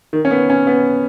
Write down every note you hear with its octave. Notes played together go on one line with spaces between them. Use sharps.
D#3
C#4
B3
C#4
B3